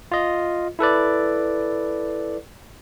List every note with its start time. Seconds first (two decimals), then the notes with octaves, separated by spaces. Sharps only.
0.12 F4 D#5
0.79 E4 A4 B4 D5